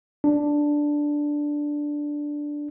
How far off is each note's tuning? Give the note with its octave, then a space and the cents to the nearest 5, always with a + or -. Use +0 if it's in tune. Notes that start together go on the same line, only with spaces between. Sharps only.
D4 +0